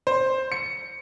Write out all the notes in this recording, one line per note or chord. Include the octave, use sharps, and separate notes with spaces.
C5
C#7